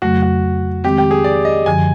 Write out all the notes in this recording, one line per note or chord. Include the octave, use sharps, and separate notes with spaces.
F2 C#3 F#3 A3 F#4
F#4
D#3 G#3 C4 G4
G4
G#4
D5
D#5
F#2 D3 F3 G#5